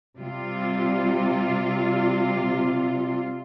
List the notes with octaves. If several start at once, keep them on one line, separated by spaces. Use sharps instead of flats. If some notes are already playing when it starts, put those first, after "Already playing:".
C3 G3 F4